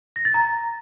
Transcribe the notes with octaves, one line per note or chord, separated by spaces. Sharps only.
A#6
A6
A#5